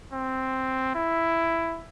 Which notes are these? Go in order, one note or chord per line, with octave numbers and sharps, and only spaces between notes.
C4
E4